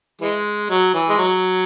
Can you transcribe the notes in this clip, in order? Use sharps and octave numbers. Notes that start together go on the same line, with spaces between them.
E3 G#3
F#3
E3
G#3
F#3